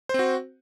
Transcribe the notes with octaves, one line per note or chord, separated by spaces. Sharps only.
C4 F#4 C5